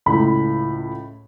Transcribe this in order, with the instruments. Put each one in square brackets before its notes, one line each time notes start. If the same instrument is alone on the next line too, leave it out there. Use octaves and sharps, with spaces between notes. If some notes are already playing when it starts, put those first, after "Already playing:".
[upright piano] C#2 A2 B5